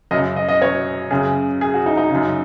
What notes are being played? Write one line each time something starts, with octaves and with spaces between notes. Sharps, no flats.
F#2 C#3 D#5
D#5
D#5
C#5
F#2 C#3 G#4
G#4
F#4
D#4
D#4
F#2 C#3